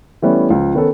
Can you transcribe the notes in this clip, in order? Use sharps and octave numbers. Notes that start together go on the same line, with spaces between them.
E3 G3 A3 B3 C#4
C#2 F3
D#3 B3 C#4 A4